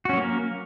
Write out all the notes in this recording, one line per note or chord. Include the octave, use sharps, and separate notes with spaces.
F#3 A#3 C#4 F#4 A#4